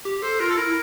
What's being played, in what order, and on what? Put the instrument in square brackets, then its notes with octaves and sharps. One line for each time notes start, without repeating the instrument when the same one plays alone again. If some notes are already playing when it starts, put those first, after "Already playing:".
[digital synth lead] G4
[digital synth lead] A4 [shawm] C5
[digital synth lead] F4 [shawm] A#4
[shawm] A4
[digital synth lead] E4 [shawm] A#4